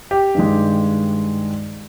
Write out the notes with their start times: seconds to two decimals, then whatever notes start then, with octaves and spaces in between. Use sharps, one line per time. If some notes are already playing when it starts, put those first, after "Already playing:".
0.11 G4
0.35 G2 D#3 G#3